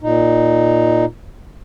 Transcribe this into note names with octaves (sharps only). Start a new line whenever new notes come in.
A#2 D#4